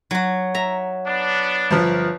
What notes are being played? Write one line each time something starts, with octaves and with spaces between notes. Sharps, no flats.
F#3 F#4
E5 A#5
B3 D4
G1 F3